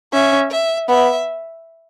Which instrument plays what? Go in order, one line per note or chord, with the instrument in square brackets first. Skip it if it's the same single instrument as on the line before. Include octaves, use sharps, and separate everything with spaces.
[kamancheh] C#4 [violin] E5
[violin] E5
[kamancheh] B3 [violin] E5